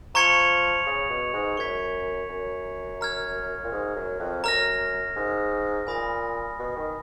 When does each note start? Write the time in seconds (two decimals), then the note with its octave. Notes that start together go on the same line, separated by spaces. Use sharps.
0.15 F3 A#5 C#6 G#6 C#7 F7
0.87 C#3
1.10 B2
1.34 G#2
1.57 F#2 C#6 G#6 B6
2.29 F#2
3.01 A#5 F6 G#6
3.64 A#2
3.72 G#2
3.96 F#2
4.19 F2
4.44 F#2 A#5 F6 A#6
5.16 G#2
5.87 A#2 G#5 B5 D#6 A#6
6.59 B2
6.76 D#3